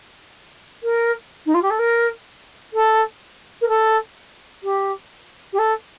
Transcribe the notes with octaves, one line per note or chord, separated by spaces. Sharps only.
A#4
D#4
F4
G4
A4
A#4
A4
A#4
A4
G4
G4
A4